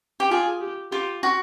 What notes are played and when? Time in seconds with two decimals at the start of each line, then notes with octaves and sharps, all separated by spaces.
0.20 G4
0.31 F4 G#4
0.61 G4
0.92 F4 G4
1.23 F#4